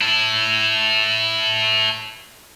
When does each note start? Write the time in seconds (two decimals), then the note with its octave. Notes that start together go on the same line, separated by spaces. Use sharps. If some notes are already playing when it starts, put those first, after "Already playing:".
0.01 E4 A4